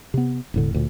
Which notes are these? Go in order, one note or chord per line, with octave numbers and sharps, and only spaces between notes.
C3 B3
E1 A2 D3
D2 A#2